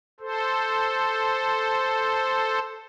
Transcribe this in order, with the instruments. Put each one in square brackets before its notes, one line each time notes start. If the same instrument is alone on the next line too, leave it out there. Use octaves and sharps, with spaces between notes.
[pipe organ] A4 C5